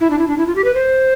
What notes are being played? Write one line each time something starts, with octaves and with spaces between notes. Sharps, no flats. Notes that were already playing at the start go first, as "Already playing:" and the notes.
E4
D4
E4
D4
E4
F4
G4
B4
C5